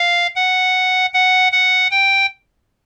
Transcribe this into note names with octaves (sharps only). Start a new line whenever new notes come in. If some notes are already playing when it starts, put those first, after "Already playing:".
Already playing: F5
F#5
F#5
F#5
G5